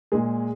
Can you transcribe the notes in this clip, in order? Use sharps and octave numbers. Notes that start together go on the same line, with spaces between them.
A#2 G#3 G#4